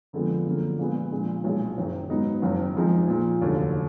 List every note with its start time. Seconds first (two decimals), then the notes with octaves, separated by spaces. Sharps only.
0.13 F2 D3 F3 G#3 B3
0.46 F#2 D3 F3 A#3
0.79 A#1 A#2 G#3 B3
1.12 A#2 F3 G#3 D4
1.44 B1 A#2 G#3
1.77 F#1 F#2 D#3
2.10 G#2 F#3 B3 D#4
2.42 F#1 F#2 D#3
2.76 F2 F3 G#3 D#4
3.08 A#2 F3 A#3
3.40 F1 D#2 D3 F#3